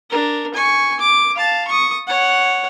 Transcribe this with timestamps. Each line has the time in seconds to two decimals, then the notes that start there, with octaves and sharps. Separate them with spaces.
0.10 D4 A#4
0.54 G#5 C#6
1.00 D6
1.35 F5 A5
1.68 C#6 D#6
2.07 C#5 F#5